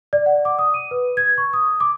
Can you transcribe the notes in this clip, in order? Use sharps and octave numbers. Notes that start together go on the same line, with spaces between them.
D5
F#5
D6
D#6
D#7
B4
G#6
C#6
D#6
D6